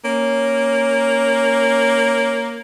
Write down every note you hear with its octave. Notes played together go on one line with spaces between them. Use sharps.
A#3 C#4